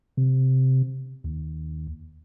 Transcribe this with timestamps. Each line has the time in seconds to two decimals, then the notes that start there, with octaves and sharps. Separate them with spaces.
0.17 C3
1.24 D#2